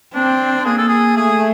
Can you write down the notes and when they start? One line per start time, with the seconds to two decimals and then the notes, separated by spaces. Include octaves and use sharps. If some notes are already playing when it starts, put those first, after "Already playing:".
0.14 C4 D4
0.65 A#3 G#4
0.78 A4
0.88 G#4
1.17 A3 G#4